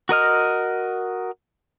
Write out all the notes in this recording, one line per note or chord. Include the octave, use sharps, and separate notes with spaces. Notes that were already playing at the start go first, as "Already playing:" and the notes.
F#4 A#4 D#5 F6